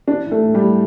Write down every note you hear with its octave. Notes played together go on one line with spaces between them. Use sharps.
E3 D4
E3
A3 A4
A2
G3 G4
A2